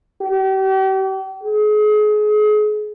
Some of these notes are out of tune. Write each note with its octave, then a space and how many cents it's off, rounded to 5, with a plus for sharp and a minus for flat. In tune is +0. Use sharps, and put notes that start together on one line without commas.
G4 -40
G#4 +35